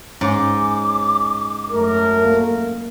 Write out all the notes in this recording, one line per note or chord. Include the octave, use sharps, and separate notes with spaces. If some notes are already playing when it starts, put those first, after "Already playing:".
G#2 C#4 D6
F#2 A3 A#4
A#3